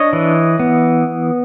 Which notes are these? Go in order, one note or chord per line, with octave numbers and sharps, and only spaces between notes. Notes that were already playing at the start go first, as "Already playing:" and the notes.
Already playing: D4 C#5 D#5
E3
B3